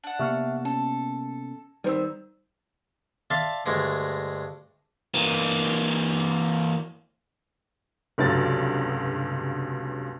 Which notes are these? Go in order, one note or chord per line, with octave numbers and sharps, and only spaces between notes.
D4 F#5
C3 A#3 B3 E5 C#6 F6
C#4 A4
D#3 G3 B3 C4 C6 E6
D5 E5 F5 A5 C6
D2 G2 G#3
E3 A#3
F1 C#2 G2 F#3 A6